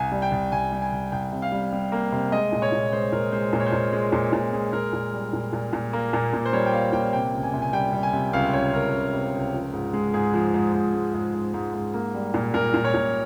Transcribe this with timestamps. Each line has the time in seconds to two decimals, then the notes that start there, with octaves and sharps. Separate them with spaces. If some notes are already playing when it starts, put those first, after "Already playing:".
Already playing: C2 G#5
0.12 G3
0.22 G5
0.32 C2
0.52 C2 G#5
0.72 G3
0.82 G#5
0.92 C2
1.12 C2 G5
1.32 C3
1.42 F5
1.52 G3
1.72 G3
1.92 A#3
2.12 C3
2.32 G#3 D#5
2.52 A#2
2.62 C#5
2.72 A#2
2.93 G#3 C5
3.12 A#2 A#4
3.32 G#3 C5
3.53 A#2 C5
3.60 C#5
3.66 C5
3.72 A#2
3.92 G#3
4.12 A#2
4.33 A#2
4.53 G#3
4.73 A#2 A#4
4.93 A#2
5.13 G3
5.33 A#2
5.53 A#2
5.73 A#2
5.93 A#3
6.13 A#2
6.33 A#2
6.45 C5
6.53 G3 C#5
6.66 G5
6.73 A#3 F5
6.93 A#2 G5
7.13 C3 G5
7.33 C#2
7.43 G#5
7.53 C3
7.62 G#5
7.73 G3 G5
7.93 G3
8.03 G#5
8.13 C3
8.33 C#2 F5
8.53 C#2 C#5
8.73 C#2 A#4
8.94 C#2
9.13 C3
9.34 C#2
9.53 F3
9.73 G#2
9.93 G#3
10.14 G#2 G#4
10.34 F3
10.54 G#2
10.74 G#2
10.94 G#3
11.14 G#2
11.34 G#2
11.54 G#2
11.74 G#2
11.94 A#3
12.14 G3
12.34 A#2
12.54 A#2 A#4
12.74 A#2
12.84 C#5
12.94 A#2